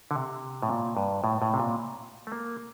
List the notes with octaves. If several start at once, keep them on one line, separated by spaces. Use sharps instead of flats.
D3
C3
A2
A#2
G2
A2
A2
C3
A#2
A3
A#3